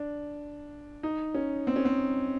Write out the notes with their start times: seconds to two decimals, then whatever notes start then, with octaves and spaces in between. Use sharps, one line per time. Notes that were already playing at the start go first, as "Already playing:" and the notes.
Already playing: D4
1.03 D#4
1.34 C#4
1.67 C4
1.76 C#4
1.85 C4